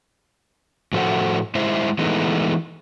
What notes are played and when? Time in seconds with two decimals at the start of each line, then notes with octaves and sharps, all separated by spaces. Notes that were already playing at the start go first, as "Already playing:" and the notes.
0.93 A2 F3 F#4 A4 C5 F#5
1.55 G#3 E4 C5 D#5 E5
1.99 E3 G#3 A3 B3 D#4